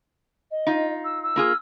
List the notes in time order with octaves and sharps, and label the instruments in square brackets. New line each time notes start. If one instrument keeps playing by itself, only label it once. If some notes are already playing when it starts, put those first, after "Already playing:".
[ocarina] D#5
[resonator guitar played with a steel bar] D#4 F4
[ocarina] E6
E6
[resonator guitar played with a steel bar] A#3 F4 G#4